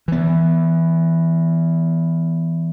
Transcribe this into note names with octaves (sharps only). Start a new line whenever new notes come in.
E3 B3